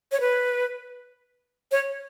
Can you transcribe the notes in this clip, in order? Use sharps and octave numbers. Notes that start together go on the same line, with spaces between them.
C#5
B4
C#5